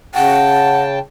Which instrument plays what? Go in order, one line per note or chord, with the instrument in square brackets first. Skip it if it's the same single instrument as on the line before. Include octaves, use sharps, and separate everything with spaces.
[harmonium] C#3 G5 A5 [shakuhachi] F#5